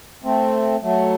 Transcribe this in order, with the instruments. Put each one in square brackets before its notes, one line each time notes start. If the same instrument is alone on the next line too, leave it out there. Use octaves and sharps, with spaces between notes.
[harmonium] A3 C4
F#3 A3